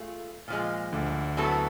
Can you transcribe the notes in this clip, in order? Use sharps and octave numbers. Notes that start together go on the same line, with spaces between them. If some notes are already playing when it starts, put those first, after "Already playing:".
Already playing: A3 F4 G#4
A#2 F3 G#3
D2 D3
F#3 B3 E4 A4